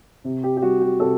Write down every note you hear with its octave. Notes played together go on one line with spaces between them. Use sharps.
C3
G4
G4
G3 F#4
G4
C3 A4